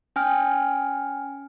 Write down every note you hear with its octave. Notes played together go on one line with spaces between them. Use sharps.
C#4 G5 G#5 F6